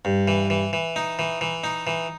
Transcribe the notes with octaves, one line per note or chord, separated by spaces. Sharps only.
G2
E3
E3
E3
D#4
E3
E3
D#4
E3